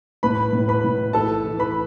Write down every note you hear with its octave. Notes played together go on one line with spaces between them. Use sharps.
A2 B4 B5
A2
B4 B5
A2
E3 A4 A5
E3
B4 B5